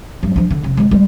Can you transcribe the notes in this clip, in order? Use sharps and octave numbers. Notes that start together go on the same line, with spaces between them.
G2 F#3
F3 D4
D3
F1 C#3
D3 G#3
G3 G#3